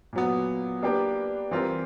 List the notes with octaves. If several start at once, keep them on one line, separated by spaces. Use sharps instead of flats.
A#2 F#3 B3
A#3 D4 G4 B4
E3 G3 C4 F4 A#4